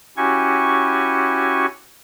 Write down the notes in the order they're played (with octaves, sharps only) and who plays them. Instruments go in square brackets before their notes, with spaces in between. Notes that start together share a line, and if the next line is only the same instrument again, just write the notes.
[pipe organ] C#4 E4 F#4 G4 G#5 C#6